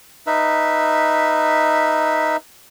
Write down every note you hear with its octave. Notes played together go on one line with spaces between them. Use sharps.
D#4 B4 E5